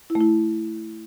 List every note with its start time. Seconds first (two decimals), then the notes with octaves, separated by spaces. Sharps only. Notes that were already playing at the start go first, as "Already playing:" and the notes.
0.10 E4
0.15 A3
0.21 E4